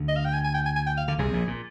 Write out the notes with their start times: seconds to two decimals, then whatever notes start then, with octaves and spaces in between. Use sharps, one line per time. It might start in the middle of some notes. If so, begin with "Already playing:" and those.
Already playing: D2 D3
0.09 D#5
0.16 F5
0.25 G5
0.34 G#5
0.45 G#5
0.55 G5
0.66 G#5
0.76 G#5
0.87 G5
0.98 F5
1.08 D3 F5
1.19 C2 C3 G#4
1.33 A#1 A#2
1.47 A#2